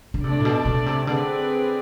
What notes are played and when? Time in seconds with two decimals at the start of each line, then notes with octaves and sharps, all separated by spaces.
0.14 D3
0.24 C3 A3 D4 A4 D5
0.40 A2
0.45 B2
0.65 B2
0.86 C3
1.07 D3 C4 G#4 B4 D5